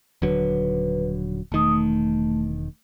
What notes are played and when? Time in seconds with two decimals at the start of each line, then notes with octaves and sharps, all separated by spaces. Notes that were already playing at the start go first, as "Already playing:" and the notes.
0.22 D#1 D3 F#3 B4
1.52 E1 D#3 A3 D#6
1.72 A3